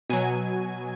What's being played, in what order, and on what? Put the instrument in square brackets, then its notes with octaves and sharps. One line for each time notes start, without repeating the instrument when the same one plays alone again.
[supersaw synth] B2 F#3 G#5